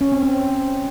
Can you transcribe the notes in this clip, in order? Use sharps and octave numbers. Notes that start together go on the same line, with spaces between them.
C#4
C4
C4